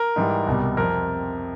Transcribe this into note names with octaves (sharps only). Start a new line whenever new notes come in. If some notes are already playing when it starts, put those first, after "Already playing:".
Already playing: A#4
G#2 E3 G3
C2 B2 G3
F2 C3 F3 A#4